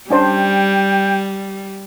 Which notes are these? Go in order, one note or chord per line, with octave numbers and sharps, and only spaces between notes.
G3 C#4 D4 C5 G5